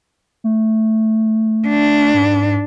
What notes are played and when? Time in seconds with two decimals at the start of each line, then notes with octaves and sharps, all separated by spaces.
0.44 A3
1.68 D4
2.14 G#2